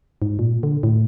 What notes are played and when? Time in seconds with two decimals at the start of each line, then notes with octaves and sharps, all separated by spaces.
0.22 G#2
0.39 A#2
0.63 D3
0.83 A2